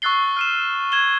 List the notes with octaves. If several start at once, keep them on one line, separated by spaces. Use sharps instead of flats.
C#6 E6 F#6 A6 C7 G7
F6 D#7 E7
G#6 E7 G7